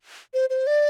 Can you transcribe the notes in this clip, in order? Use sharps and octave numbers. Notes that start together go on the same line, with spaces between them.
C5
C5
D5